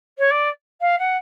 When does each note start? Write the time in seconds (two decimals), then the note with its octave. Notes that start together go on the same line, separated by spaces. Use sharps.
0.18 C#5
0.30 D5
0.81 F5
0.98 F#5